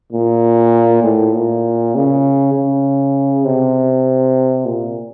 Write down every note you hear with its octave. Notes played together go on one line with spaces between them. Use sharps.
A#2
A2
A#2
C#3
C#3
C3
A#2